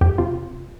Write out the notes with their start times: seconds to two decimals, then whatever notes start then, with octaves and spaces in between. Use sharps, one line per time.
0.01 F2 G4
0.18 C3 F4